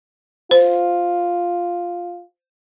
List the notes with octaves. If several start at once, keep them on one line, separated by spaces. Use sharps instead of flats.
F4 C5